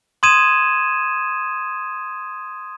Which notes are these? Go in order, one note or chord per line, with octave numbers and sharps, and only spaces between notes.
C6 D#6 G#6 D#7 E7